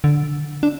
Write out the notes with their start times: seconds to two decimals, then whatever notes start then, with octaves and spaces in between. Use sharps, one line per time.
0.04 D3
0.63 D4